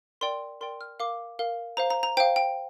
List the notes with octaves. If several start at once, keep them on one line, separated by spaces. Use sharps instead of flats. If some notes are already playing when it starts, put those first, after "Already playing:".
A#4 D5 G5 C6
A#4 D5 G5 C6
F6
A#4 F5 D6
A#4 F5
C5 F5 A#5
A#5
A#5
C5 F5 G5
G5